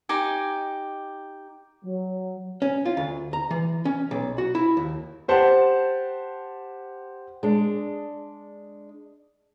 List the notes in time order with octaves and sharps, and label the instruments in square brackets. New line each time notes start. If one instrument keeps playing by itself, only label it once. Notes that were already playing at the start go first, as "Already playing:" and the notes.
[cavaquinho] D#4 G4 G#5
[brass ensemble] F#3
[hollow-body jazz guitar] C#4
F4
D2
A#5
E3
C#4
B1
F#4
E4
D#2
[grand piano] G4 C5 F#5 A5
[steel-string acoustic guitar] G#3 D4